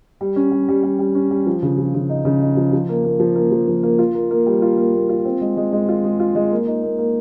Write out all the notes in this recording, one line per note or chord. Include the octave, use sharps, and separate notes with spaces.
G3
C#4
G3
G3
G3
G3
C#4
G3
F3
C#3
F3
C#3
D#4
C#3
D#4
F3
F3
A#3
A#3
F3
A#3
F3
F3
A#3
F4
A#4
A#3
G3
F4
A#3
A#3
F4
C4
G#3
G#3
G#3
F4
G#3
F4
G#3
A#3
D#4
A#3
A#3